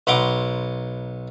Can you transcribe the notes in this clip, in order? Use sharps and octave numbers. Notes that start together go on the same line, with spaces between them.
B1 B4 F#5 A#5 C6 D6